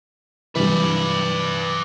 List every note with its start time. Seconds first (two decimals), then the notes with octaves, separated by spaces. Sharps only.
0.56 G2 C3 E3 F#3 G3 B4 D5